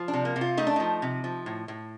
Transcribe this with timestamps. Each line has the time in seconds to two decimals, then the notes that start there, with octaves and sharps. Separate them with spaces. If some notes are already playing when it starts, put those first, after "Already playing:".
Already playing: F3
0.08 D4
0.13 C3
0.25 A#3
0.36 C3
0.41 F4
0.57 A3 D#4
0.67 D4
0.76 F3 D#4
1.02 C3
1.24 F3
1.46 A2
1.68 A2